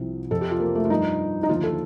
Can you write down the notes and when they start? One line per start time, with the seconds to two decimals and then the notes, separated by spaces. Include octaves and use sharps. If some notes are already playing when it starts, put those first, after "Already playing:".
Already playing: C2 C3 F3
0.31 F2 C3 F3 A4
0.41 G4
0.51 F4
0.60 A#3
0.75 A3
0.85 F4
0.90 G2 F3 D#4
1.43 D#4
1.49 D#2 D3 F3 F4
1.64 A4